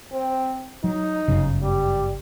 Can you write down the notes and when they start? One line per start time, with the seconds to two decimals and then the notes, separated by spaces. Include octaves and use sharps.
0.12 C4
0.84 F#3 D#4
1.28 G1 F#2 C#3
1.62 G3